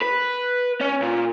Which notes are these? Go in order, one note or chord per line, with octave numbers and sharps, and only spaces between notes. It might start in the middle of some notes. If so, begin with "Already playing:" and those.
B4
C#4
A#2